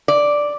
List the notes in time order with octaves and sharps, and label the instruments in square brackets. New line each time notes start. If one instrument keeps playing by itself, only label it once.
[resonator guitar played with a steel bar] D5